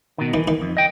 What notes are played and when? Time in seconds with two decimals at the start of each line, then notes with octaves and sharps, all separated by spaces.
0.18 B2 D#3
0.34 D#3 E3
0.48 D#3
0.62 F2
0.77 D#5 G5